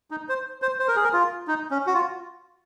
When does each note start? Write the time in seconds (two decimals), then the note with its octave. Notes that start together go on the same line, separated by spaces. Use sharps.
0.11 D#4
0.29 C5
0.62 C5
0.79 C5
0.88 A#4
0.96 G#4
1.04 A#4
1.13 F4
1.48 D#4
1.71 C#4
1.87 F#4
1.94 F4